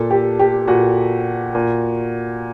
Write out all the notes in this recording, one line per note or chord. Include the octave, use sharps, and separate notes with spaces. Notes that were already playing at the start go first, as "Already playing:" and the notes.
Already playing: A#2 A4
G4
G4
A#2 F#4
A#2